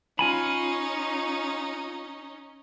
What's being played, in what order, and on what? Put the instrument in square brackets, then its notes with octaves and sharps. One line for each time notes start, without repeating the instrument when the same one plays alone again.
[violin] C#4 D#4 [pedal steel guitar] F4 G#5 B5